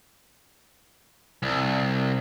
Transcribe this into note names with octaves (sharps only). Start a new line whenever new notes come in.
C2